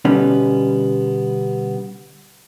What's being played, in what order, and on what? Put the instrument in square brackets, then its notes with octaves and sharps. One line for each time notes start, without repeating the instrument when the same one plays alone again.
[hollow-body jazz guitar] B2 D3 G3 B3 C#4